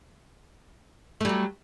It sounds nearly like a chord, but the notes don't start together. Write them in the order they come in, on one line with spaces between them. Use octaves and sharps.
A3 G3 F#3